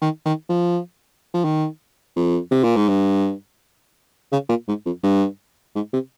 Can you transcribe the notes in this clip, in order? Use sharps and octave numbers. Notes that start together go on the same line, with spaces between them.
D#3
D#3
F3
F3
D#3
F2
C3
A#2
G#2
G2
C#3
A#2
G#2
F2
G2
G#2
C3